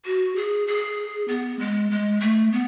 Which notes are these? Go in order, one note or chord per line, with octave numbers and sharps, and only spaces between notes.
F#4
G#4
G#4
B3
G#3
G#3
A3
B3